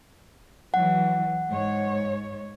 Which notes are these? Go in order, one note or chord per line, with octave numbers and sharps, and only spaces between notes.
E3 F#3 F#5
G#2 C#5